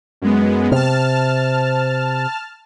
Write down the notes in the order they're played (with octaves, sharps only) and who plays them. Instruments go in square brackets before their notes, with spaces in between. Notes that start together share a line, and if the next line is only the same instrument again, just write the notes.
[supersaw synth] F#2 G#3 B3
[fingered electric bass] C3 [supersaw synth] A5 F6